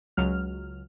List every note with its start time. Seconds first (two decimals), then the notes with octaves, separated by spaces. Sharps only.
0.17 C#2 F#3 F6